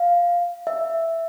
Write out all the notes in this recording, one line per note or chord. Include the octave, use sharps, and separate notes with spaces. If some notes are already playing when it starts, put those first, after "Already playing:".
Already playing: F5
E5